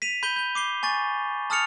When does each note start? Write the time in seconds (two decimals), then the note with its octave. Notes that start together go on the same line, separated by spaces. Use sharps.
0.02 B6 D#7 F7
0.23 B5 G6 B6 D#7 G7
0.36 G6 G7
0.55 D6 C7 G7
0.83 G#5 C#6 A6
1.50 A5 D#6 F6 A6 C#7 F7